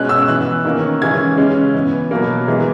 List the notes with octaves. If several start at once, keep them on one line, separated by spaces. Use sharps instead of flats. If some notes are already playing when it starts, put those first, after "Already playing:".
Already playing: B2 G#3 C#4 F#6
E6
E3 B3 F#6
D#3 A#3 C#4
C#3 E3 G#3 C#4 G#6
C#3 G#3 C#4
E3 B3
B2 F#3 A#3
E3 G#3 B3